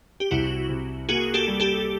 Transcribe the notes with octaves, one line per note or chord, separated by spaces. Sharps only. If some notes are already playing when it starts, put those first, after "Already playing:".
G4
C2 E4 F#4
C3
A#3 F#4 G#4
G4 A4
G3
G4 A4